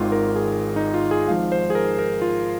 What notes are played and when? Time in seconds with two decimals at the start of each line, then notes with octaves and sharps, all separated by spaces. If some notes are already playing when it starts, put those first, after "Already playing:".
Already playing: G#1 G#2 D#3 F4
0.12 A#4
0.36 G#4
0.76 D#4
0.94 F4
1.11 G#4
1.28 G#1 G#2 F3 F5
1.52 C5
1.70 G#4
1.75 A#4
1.99 A#4
2.22 F4